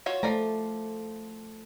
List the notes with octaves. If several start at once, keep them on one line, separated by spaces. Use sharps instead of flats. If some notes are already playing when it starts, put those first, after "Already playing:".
F4 F#4 C#5
F3 A3 D5 A#5